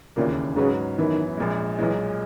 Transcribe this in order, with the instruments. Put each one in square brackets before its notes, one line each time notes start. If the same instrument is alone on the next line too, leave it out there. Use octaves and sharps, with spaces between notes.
[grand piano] E1 D#2 C#3 E3 A#3 [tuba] A#2
[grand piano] G#2 F#3 C#4 F#4 B4 [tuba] C#3
[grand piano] F#2 E3 B3 [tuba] D#3
[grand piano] A#1 A#2 G#3
[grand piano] B1 A#2 G#3 [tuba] E3